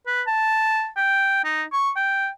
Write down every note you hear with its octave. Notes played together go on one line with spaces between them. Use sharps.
B4
A5
G5
D#4
C#6
G5